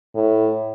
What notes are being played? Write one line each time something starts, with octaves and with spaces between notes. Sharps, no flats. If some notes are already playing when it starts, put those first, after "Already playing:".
A2